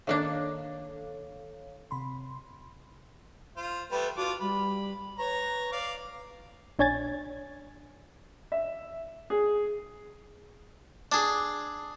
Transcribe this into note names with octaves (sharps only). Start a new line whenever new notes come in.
D#3 A#3 D4 A4 C#5 F5
C3 B5 C6
F4 C5
G3 A3 B3 B4
D4 F4 F#4 D6
G3 B5
B4 C#5 A#5
D5 F5 D6
A#1 D4 C#5 G#5 G#6 A6
E5
G#4
D4 G#4